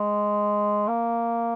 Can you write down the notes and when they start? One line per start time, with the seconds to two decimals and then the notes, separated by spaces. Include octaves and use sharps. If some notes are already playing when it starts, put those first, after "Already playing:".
Already playing: G#3
0.88 A#3